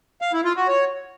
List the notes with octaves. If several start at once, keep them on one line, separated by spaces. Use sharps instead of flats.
F5
E4
F4
F#4
C#5